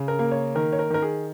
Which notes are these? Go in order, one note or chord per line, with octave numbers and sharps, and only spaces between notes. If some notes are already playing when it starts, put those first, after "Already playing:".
Already playing: C#3
A#4
A#3
C#5
D#3 A#4
C#5
A#4
D#3 A#4
G#4